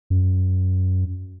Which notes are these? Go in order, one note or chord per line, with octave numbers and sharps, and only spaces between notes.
F#2